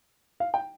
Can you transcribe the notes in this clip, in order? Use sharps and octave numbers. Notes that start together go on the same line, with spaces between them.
F5
G5